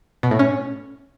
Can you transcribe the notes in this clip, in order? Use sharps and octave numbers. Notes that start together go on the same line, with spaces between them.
B2
A2
C#4